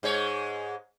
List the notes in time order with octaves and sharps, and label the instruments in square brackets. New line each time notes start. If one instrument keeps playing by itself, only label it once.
[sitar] G#2 G#3 C#5